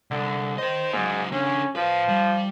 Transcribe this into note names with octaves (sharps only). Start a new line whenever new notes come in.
C2 D3
A#4 C5 D#5
G#2 F#3 A#3
C#3 C#4 D4
A2 F3 B4
G3